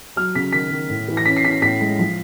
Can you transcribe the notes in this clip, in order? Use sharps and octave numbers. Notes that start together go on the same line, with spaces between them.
F#3 F6
C#3 B6
D#3 B6
D#3
A2
E3
A#6
C#4 B6
C7
C#4 B6
A2 B6
G#3
F3